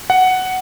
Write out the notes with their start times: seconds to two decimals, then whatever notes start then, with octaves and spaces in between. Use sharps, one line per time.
0.10 F#5